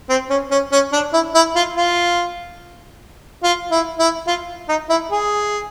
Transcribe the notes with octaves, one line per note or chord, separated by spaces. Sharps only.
C4
C#4
C#4
C#4
D4
E4
E4
F4
F4
F4
E4
E4
F4
D#4
E4
G#4